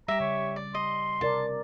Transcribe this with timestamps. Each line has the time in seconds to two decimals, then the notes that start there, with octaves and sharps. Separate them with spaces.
0.08 G3 G4 E5 A#5
0.20 C#3 C#5
0.56 D5
0.74 D#5 C6
1.21 C3 A#4 D5 A5